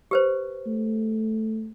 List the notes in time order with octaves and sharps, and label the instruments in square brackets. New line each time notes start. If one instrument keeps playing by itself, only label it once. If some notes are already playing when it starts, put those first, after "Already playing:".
[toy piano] G4 B4 C5
[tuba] A3